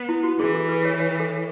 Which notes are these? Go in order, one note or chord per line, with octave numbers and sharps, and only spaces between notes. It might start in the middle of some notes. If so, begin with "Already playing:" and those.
Already playing: B3
E4
F#4
E3 G#4
A4
B4
C#5
C#5
A4